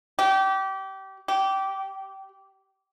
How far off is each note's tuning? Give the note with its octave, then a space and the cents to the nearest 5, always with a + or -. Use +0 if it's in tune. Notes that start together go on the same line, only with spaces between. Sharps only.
G4 -25
G4 -20